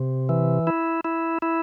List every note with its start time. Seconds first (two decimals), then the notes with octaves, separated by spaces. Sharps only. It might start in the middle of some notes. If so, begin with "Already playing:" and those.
Already playing: C3
0.29 E3
0.67 E4
1.04 E4
1.42 E4